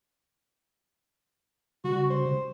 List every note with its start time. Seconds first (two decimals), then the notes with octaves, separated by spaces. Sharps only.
1.84 C#3 G3 F#4
2.10 C5